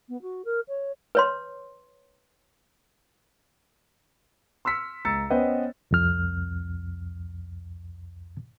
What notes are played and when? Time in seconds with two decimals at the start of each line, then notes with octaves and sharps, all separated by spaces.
0.08 B3
0.22 F#4
0.45 A#4
0.68 C#5
1.15 B4 C#5 C6
4.65 C6 E6 F6 B6 C#7
5.05 C#2 A#5 E6 A6 C#7
5.30 B3 C#4 B4 C5 D#5 G5
5.91 C2 F2 F6